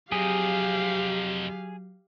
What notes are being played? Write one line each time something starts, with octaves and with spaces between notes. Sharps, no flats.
F2 C3 F#3 G4 G#4 F5